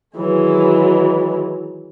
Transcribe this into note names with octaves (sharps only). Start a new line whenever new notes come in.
D#3 E3 F#3 G#3